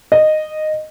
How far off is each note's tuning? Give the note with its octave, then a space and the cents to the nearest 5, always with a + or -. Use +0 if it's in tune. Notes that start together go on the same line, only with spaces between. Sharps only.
D#5 -10